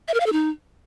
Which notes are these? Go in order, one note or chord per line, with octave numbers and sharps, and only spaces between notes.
E5
A#4
F5
A4
D#4